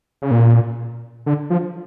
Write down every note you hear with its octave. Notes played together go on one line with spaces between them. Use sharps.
C#3
A#2
D3
F3